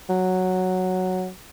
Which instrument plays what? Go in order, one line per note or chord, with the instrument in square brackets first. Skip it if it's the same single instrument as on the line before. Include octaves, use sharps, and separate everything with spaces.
[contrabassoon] F#3